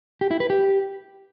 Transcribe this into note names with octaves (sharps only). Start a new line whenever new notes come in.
G4
E4
B4
G4